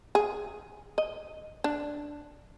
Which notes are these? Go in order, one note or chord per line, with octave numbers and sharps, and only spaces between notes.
G#4
D#5
D4